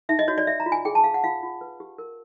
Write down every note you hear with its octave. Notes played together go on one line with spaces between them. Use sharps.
D#4 E5
D#5
F#4 C#5
D5
C#5 E5
A#5
F4
G#5
G#4 G5
A5
G#4 F5
F#5
F4 F5
F4
B4
G4
A#4